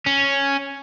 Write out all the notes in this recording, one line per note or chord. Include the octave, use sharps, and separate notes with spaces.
C#4